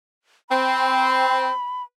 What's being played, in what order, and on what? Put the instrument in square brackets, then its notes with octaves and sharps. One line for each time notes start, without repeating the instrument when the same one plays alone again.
[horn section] C4 [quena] B5